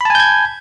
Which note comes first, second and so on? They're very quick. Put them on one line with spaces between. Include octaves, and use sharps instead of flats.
B5 A5 G#5 G6 G#6